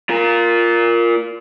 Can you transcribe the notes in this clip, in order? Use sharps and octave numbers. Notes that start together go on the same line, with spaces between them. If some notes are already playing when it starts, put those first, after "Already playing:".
F4 A#4